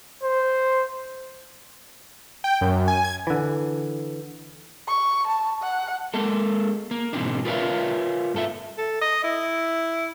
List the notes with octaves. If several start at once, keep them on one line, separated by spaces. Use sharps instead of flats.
C5
G5
F#2
G#5
G#6
D3 E3
C#6
A5
F#5
G#3 A#3 A4
A#3
G#2 B2 E3 A#3 C4 D4
F4 A#4 B4 C#5 E5 F5
G2 A4 E5
A4
D#5
E4